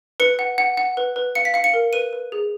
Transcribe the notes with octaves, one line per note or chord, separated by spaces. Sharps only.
B4 C#7
F#5
F#5
F#5
B4
B4
F5 C#7
B6
F5 C#7
C#7
A#4
B4 D#7
B4
G#4